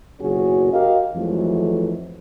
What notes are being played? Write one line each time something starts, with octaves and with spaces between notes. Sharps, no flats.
F#1 B1 A#2 C#4 F#4 G#4
F#4 G4 A#4 D#5 F5
F2 E3 F#3 G#3 A3